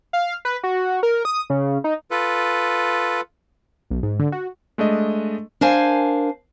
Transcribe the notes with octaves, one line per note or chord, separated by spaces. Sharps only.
F5
B4
F#4
A#4
D#6
C#3
D#4
F4 A4 B4
B1
G#2
D3
F#4
G#3 A3 D4 D#5
D4 A#4 C5 F5 G#5